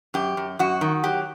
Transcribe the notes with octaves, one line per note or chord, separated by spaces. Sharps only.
F#2 G4
F#2
F#2 F#4
D#3
F#3 G4